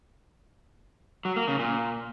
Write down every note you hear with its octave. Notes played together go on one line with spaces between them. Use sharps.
F#3
A#3
C#3
A#2